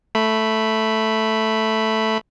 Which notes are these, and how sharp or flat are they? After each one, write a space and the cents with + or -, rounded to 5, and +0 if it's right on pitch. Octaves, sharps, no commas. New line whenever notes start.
A3 +0 B5 +0